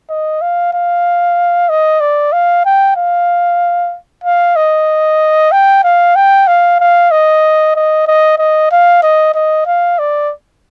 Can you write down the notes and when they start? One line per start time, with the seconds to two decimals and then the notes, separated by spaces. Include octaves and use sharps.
0.10 D#5
0.41 F5
0.73 F5
1.69 D#5
2.00 D5
2.33 F5
2.65 G5
2.96 F5
4.24 F5
4.56 D#5
5.52 G5
5.84 F5
6.16 G5
6.47 F5
6.80 F5
7.11 D#5
7.76 D#5
8.07 D#5
8.38 D#5
8.71 F5
9.03 D#5
9.34 D#5
9.66 F5
9.99 D5